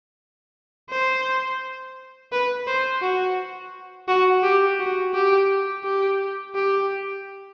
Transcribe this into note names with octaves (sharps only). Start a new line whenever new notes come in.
C5
B4
C5
F#4
F#4
G4
F#4
G4
G4
G4